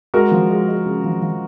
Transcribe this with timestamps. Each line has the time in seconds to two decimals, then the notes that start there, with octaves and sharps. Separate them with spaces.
0.14 G#3 F#4 A#4
0.32 F3
0.50 G#3
0.68 G#3
0.86 C#3
1.04 F3
1.22 F3